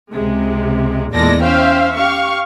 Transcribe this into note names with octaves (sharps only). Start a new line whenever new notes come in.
C#2 C3 G#3
E2 A#2 G#3 A4 D5 A#6
C#4 C5 E5 F5 G5
G4 F5 C#6